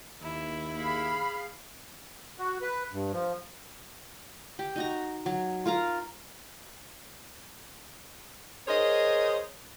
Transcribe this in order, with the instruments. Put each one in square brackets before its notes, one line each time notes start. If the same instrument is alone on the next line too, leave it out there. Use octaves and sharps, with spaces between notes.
[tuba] D#2 [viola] A#3 [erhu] E4
[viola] G#4 F5 [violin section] B5
[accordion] F#4
B4
G2
F3
[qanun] G4
D#4 F#4 A#5
F#3
F4 A#4 F5 A#5
[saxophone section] G#4 A#4 C5 C#5 D#5